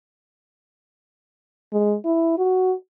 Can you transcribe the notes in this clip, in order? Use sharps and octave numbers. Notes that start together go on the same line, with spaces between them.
G#3
E4
F#4